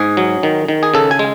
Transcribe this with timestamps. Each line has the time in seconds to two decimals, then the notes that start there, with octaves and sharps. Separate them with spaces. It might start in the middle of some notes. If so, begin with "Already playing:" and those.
Already playing: G#2 G#4
0.17 F#3
0.43 D#3
0.68 D#3
0.83 G#4
0.94 C#3 A4
1.11 G#5
1.19 G#3